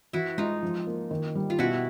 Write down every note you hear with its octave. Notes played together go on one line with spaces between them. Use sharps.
E3 E4 F#4
G#3 D#4 F4
F3
A#3
D#3
G3
F4
B2 E4 F#4